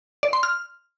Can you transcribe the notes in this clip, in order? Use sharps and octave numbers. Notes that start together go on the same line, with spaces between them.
D5
C6
F6